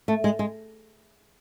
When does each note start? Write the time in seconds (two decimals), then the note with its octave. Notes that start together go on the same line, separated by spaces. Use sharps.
0.08 A3
0.24 G#3
0.39 G#3